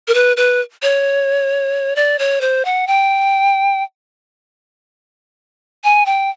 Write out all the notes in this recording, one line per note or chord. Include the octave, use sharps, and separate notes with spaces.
A#4
B4
B4
C#5
D5
C#5
C5
F#5
G5
G#5
G5